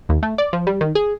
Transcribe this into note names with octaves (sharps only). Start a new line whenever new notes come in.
D#2
A3
D5
F3
G3
D#3
G#4